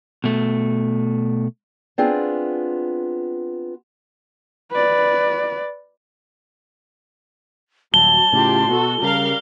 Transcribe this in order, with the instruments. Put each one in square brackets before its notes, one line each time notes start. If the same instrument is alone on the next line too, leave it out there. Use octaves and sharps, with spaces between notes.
[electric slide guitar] B2 A3
[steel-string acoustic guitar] B3 C4 D4 F4 G#4
[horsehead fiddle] B4 D5
[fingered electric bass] D#1 [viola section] F#3 [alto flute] A5 [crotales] G7
[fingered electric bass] A2 C#3 [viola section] F4 G4 C6
[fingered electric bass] B2 [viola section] F#4 A4
[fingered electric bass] C#3 [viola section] G3 A#4 F5